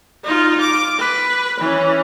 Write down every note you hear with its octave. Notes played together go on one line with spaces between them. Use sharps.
D#4 F4
D6
B4
E3 C#4